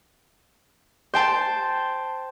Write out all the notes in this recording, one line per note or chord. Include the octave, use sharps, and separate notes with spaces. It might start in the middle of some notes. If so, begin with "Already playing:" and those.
C5 G5 A5